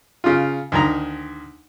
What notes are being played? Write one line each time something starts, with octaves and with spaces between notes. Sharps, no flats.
C#3 F4
D2 D#3 A#5